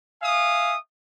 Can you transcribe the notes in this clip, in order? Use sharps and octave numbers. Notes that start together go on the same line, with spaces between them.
E5 F5 G#5 D#6